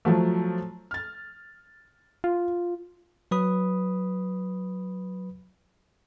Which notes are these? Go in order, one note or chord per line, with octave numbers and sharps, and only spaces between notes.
F3 F#3 A3
F6 A6
F4
F#3 B4 B5 D#6